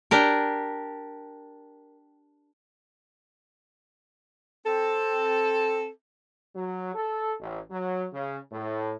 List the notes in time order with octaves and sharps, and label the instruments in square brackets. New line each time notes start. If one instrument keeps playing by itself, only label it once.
[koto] D4 G4 A#4
[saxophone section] C4 A4
[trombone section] F#3
A4
A1
F#3
C#3
A2